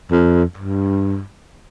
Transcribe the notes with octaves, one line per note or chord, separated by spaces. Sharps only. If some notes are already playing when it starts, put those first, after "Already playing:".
F2
G2